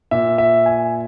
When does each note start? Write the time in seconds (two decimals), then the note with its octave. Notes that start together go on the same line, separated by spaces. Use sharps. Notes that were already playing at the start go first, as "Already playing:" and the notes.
0.11 A#2 E5
0.38 E5
0.66 G#5